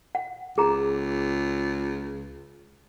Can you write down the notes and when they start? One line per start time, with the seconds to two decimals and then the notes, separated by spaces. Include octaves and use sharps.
0.15 F#5
0.58 C#2 G#4 A#5